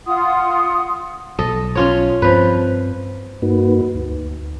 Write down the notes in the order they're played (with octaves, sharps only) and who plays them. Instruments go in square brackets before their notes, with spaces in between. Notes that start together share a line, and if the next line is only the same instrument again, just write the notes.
[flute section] F4 F#5 C6 D#6
[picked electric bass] B1 [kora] A4 D#5
[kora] C#4 F4 C#5
[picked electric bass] G2 C4 [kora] F3 B4
[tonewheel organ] G2 A#3 D#4 F#4 B4
D2